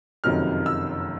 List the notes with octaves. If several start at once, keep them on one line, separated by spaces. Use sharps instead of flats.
F#1 F2 C3 D#3 F#3 F6
E6